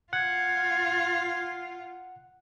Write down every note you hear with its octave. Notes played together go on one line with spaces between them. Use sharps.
F4 F#5 G#6